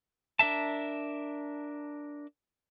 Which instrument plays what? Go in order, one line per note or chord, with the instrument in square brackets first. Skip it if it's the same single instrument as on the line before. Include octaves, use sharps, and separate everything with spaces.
[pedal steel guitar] D4 A#4 E5 A5